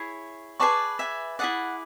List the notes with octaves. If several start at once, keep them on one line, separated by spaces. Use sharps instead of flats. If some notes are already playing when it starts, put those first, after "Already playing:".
Already playing: E4 G#4 C#5 C#6
G#4 B4 D5 A5 C#6
E5 G#5
E4 G#4 D5 F#5